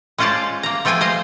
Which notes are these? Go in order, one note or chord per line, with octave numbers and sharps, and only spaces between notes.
G#3 C#4 F4 C5 D5 A5
A#3 A#5
F3 A3 F4 G5 G#5
C5 D#5 F5